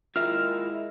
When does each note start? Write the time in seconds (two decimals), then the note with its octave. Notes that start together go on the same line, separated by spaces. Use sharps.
0.16 G#3 E4 F4 A#4 E5 F6